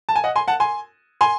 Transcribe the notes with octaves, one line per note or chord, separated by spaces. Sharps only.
A5
G#5
D#5 F#5
G#5 C6
F#5 A5
G#5 C6
G#5 C6